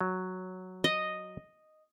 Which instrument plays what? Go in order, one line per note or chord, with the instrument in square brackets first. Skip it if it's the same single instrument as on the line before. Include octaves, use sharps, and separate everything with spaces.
[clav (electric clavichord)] F#3
[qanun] D#5